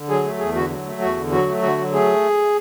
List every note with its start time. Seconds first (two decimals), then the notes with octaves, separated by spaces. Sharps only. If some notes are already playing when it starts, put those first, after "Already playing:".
Already playing: D3
0.09 F#3 G#4
0.24 A3
0.39 E2 G#4
0.55 D3 F#4
0.70 F#3
0.86 A3
1.01 E2 F#4
1.16 D3
1.31 F#3 F#4
1.47 A3
1.62 D3 F#4
1.78 F#3
1.92 A3 G#4